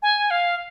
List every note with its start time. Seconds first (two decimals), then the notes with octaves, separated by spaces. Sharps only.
0.02 G#5
0.31 F5